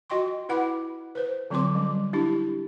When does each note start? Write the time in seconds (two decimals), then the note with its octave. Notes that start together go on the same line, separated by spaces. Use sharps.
0.10 F4 F#4 D#5 G5 C6 C#6
0.49 E4 B4 F#5 B5 D6
1.15 B4 C5
1.50 D3 F#3 C4 F4 C6 D6
1.75 G3 C#4
2.13 D4 E4 G4